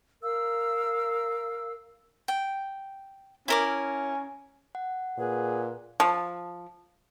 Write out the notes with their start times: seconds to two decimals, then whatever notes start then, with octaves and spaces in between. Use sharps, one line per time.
0.23 A#4 F5 E6
2.28 G5
3.48 C#4 E4 A#4 D6
4.75 F#5
5.18 A#2 G#4 B4
6.00 F3